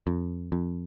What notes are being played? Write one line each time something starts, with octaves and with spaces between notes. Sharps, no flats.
F2
F2